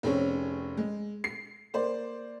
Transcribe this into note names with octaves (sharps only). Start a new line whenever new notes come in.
F1 C4 C#4 G#4 C#5
G#3
C7
A#3 C5 D5